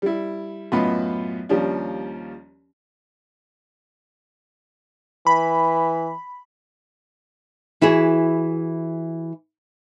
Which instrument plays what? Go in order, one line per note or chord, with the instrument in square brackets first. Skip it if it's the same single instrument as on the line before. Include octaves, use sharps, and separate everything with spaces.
[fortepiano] G3 E4
F#2 A2 B3 F4 D#5 B5
D#2 F3 G3 C#4 D4
[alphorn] E3 [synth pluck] B5
[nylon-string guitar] E3 E4 F#4 G#4